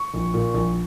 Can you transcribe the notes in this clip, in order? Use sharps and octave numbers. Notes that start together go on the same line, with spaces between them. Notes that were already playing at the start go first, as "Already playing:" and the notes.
Already playing: C#6
A#1
A#2
A#1